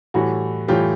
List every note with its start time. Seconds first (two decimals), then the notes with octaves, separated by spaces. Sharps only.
0.14 A2 E3 G3 F#4
0.68 A2 E3 G3 F4 G4